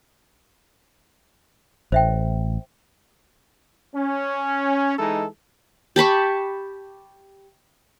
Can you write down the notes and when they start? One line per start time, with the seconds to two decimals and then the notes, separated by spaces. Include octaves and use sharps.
1.92 A1 C5 E5 G5
3.94 C#4
4.97 E3 G#3 D#4 A4
5.96 G4 A5 B5 C#6